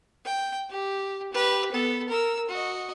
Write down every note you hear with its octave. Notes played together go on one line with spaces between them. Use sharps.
G5
G4
G4 B4
B3 A4
A#4 E6
F#4 D#5